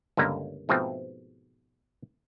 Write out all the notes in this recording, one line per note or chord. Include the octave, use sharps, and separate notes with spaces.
G1 C#2 D3 A#3 A#5
G#2 B2 F3 A3 C4